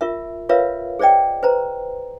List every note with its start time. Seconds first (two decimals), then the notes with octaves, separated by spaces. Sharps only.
0.01 F4 A#4 E5
0.49 F4 A#4 B4 C#5 E5 F5
0.99 G#4 C5 D5 D#5 G5
1.43 B4 C5 A#5